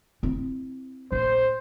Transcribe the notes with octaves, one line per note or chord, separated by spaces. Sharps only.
C4 E4
A#1 C5